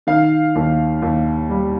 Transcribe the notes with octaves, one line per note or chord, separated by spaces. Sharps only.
D#3 F5
D#2
D#2
G3